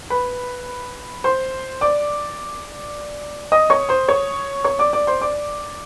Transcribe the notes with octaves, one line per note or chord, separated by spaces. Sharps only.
B4 B5
C5 C6
D5 D6
D#5 D#6
C#5 C#6
C5 C6
C#5 C#6
C#5 C#6
D5 D6
D5 D6
C5 C6
D5 D6